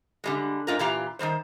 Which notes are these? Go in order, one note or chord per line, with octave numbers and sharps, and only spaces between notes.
D3 G3 G#3
G#2 F4 A#4
A#2 E3 F4 G4 F5 A#5
D#3 E3 G3 C5